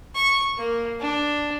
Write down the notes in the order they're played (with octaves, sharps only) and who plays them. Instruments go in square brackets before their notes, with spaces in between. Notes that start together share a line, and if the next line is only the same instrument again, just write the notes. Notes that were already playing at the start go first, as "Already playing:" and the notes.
[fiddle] C#6
A#3
D4